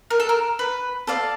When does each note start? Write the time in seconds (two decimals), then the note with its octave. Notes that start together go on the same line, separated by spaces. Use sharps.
0.10 A#4
0.20 A4
0.29 A#4
0.59 B4
1.07 A4 D5 F5